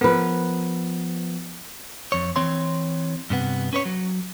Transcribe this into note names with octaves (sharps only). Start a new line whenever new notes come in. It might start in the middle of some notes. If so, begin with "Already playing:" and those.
F3 B3 A#4 B4
F2 C#5
E3 C4 C#5 C6
G2 C3 B3
C#4 B4 C#5
F#3